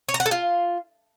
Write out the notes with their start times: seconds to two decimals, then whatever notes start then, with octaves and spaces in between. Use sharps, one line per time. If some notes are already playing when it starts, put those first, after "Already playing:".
0.09 C#5
0.14 A#5
0.20 F#5
0.26 A4
0.31 F4